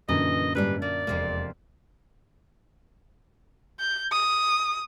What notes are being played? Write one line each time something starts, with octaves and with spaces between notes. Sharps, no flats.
F#2 A#2 D3 E3 D#5
G#2 G3 D4 B4
A#3 D5
E1 F2 C3 A#3
G6
D#6